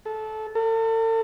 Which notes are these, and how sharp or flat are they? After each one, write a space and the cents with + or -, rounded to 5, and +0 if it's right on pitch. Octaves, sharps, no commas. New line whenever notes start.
A4 -20
A4 +40